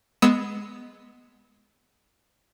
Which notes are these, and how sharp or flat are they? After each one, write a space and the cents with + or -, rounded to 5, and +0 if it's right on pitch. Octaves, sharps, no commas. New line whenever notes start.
G#3 +0 B3 +0 E6 -25